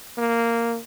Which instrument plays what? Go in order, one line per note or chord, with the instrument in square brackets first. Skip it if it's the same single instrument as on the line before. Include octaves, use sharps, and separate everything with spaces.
[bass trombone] A#3